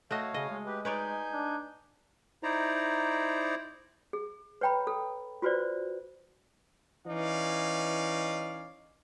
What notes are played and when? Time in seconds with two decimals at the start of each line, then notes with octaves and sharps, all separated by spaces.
0.11 A3 F#4 C#5 D#5 F5
0.34 C#3 D#5
0.50 G#3
0.66 G4 B4
0.85 D#4 B4 C#5 D5 G#5 G6
1.33 D4
2.43 D#4 E4 C5 D5 A#5
4.13 G#4
4.61 B4 C#5 G5 A#5 B5
4.87 A4
5.42 F4 F#4 B4 C5 D5
7.06 E3 C#4 D#4 D5 F5